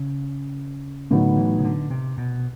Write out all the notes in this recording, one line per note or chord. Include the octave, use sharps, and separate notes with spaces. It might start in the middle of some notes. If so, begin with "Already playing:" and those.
Already playing: C#3
A2 D3 F#3 B3 D#4
E3
C#3
D3
C3
B2